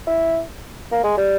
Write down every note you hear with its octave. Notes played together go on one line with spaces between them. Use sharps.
E4
A#3
G#3
G3